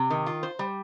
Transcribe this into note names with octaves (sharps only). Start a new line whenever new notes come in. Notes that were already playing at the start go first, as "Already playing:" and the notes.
Already playing: C3
D#3
F4
C5
G3